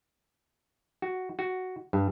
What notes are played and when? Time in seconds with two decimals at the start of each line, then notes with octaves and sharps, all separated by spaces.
1.02 F#4
1.39 F#4
1.93 G2